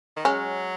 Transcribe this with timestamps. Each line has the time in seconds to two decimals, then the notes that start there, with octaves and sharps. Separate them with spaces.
0.16 D#3
0.25 F#3 G#3 C#4